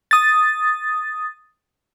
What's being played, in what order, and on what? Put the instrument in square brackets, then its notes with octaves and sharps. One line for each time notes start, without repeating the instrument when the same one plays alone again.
[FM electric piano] D#6 A6